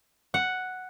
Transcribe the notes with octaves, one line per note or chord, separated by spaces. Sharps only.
F#5